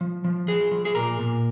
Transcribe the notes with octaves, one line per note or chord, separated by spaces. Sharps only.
F3
F3
F3 G#4
F3
G#4
A#2 A#4
A#2